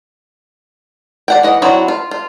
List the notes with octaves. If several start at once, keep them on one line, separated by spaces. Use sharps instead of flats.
D5 F#5 G5
E3 D#5 F#5
F#3 C4 D4 E4 F#4
F4
F4